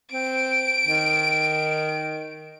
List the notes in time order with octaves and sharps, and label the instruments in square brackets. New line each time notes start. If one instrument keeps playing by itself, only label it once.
[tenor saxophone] C4 [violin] D7
[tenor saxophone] D#3